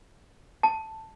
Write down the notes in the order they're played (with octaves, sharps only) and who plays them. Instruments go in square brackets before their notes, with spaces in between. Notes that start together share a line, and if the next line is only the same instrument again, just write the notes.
[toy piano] A5